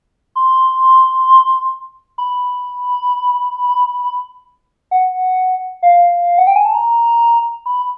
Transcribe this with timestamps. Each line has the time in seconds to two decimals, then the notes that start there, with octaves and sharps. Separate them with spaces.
0.36 C6
2.18 B5
4.91 F#5
5.83 F5
6.38 F#5
6.47 G5
6.56 G#5
6.65 A5
6.74 A#5
7.66 B5